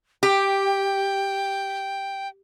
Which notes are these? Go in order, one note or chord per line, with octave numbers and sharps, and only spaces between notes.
G4 G5